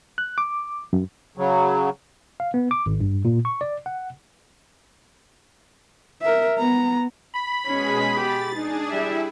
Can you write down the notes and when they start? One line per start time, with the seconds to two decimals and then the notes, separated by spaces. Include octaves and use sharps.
0.18 F#6
0.38 D6
0.93 F#2
1.37 C#3 F#3
2.40 F5
2.54 B3
2.71 D6
2.86 G#1
3.00 G2
3.25 A#2
3.45 C#6
3.61 D5
3.86 F#5
6.22 A#4 E5
6.59 B3 A#5
7.35 B5
7.66 B2 G#3 C#4 G#4
8.15 G4 A6
8.55 D4 D#4 G#4
8.91 G3 E4 G4 E5